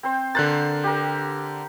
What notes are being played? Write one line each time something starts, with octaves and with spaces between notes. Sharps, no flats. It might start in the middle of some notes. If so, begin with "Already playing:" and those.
C4 C5
D3 A#4 C5 F#6 A6
G4 A#4